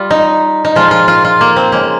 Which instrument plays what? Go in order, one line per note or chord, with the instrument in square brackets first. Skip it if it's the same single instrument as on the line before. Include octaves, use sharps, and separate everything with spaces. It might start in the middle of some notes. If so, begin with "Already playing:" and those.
Already playing: [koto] G3 F4
D#4
D#4
A#2 F3 G#3 F4
F4
F4
F4
A#3
C4
C#3 G#3 A#3